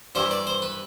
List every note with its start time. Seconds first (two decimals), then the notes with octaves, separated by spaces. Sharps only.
0.15 G2 E3 G3 C5
0.31 D5
0.47 C5
0.62 B4